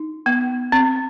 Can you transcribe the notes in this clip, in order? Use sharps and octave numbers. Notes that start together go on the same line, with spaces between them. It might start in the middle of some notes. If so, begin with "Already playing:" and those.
Already playing: D#4
B3
C4